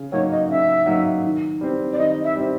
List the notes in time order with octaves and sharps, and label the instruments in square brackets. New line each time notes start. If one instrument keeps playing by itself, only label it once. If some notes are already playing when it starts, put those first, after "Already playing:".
Already playing: [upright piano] C#3
[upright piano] F#3 A#3 D#4 [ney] C#5
[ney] D#5
[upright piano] C#3 [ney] E5
[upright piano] F#3 A#3 D#4
D#3
G3 C4
[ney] D5
[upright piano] D#3 [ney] D#5
[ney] E5
[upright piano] G3 C4